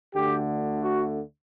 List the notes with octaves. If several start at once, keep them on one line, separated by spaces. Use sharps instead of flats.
D2 D3 A3 G4
F#4